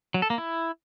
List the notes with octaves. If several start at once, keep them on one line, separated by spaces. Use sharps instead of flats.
F#3
A4
A#3
E4